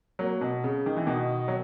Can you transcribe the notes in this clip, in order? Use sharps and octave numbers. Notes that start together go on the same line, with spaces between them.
F#3 A#3
B2
C#3
D#3
E3
B2 D#3
F#3